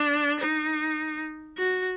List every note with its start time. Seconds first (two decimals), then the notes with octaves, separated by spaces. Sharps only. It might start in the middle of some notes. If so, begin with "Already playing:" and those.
Already playing: D4
0.40 D#4
1.58 F#4